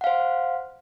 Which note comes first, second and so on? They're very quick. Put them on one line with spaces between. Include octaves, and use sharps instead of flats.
F#5 F5 C5